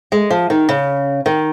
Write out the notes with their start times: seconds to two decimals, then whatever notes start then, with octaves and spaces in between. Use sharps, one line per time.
0.12 G#3
0.30 F3
0.50 D#3
0.69 C#3
1.26 D#3